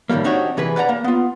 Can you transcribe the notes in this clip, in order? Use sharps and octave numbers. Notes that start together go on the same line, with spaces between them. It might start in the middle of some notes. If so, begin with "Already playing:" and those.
A2 D#3 E3 G3 A#3
C4 D4 D#4 F#4 G4 C#5
C3 E3 G#4 B4
B4 D5 F#5 G5 A#5
A#3
B3 F4